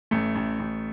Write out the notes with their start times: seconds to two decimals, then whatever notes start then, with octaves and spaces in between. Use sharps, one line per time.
0.11 A1 A3
0.36 A1
0.60 A1